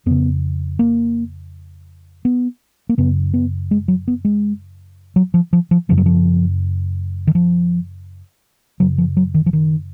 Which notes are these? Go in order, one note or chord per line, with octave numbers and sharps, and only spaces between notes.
F2 C#3 B3
A#3
B3
A#3
F#2 C#3 B3
B3
G#3
F#3
B3
G#3
F#3
F3
F3
F3
F#2 C#3 F3
F#3
F3
D#3
F3
F#2 C#3 F#3
F3
F#3
D#3
F3
D#3